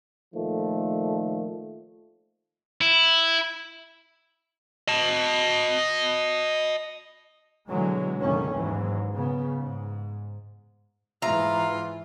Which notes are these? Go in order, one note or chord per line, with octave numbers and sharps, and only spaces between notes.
A#2 D#3 F3 A3
E4
D#5 A5
B2 D3 E3 F#3 G#3
F#1 D3 D#3 A3 C#4
D#2 G#2 E3 F#3
C#3 B3
G#2
G#2 E3 F4 E5 A#5